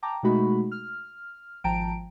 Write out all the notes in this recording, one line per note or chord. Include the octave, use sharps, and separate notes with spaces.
G5 A5 A#5 D6
B2 G#3 A3 D#4 F#4 B5
F6
G#1 F3 G5 A5 A#5 D7